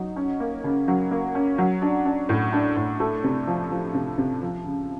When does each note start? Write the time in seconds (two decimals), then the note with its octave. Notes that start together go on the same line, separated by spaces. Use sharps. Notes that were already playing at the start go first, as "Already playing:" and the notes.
Already playing: F#3 D#4
0.16 C#4
0.40 A#3
0.64 C#3
0.88 F#3
1.11 A#3
1.35 C#4
1.58 F#3
1.82 D4
2.05 D4
2.29 A2
2.53 D4
2.77 A2
3.00 A3
3.24 C3
3.47 F3
3.71 F3
3.95 C3
4.18 C3
4.42 F3
4.66 C#3